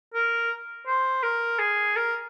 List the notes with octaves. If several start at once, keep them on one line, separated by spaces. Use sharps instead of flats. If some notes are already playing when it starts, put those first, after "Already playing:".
A#4
C5
A#4
G#4
A#4